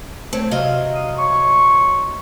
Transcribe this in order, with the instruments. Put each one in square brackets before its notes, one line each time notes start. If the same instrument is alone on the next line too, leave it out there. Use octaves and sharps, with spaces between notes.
[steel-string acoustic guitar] A3 C4 [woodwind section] C#5
[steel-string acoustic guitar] C3 F#3 D#5 [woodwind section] F5
[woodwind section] F5 D#6
C#5 C6 C#6